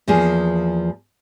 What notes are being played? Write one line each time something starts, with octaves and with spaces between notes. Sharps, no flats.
E2 F3 A#3 G#4